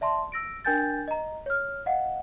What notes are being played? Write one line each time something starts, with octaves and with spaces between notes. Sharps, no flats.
D5 E5 A5 C6
E6 A#6 D7
D4 A#4 G5 G#5 G6 A6
D#5 A#5
C#5 F6
D#5 F5 F#5